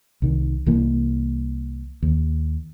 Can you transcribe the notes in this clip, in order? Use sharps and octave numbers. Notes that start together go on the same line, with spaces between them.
C2 D#3
C2 E3 A#3
D#2